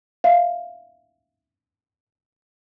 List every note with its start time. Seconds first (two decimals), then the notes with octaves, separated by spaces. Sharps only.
0.24 E5 F5